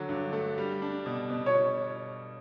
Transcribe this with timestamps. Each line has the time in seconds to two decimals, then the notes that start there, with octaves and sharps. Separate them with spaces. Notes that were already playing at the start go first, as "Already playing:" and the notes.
Already playing: D3 F#3
0.09 G2
0.33 A3
0.58 G3
0.82 D4
1.06 B2
1.30 B2
1.46 C#5